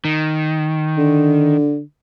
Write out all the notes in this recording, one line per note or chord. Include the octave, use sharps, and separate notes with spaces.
D#3
D3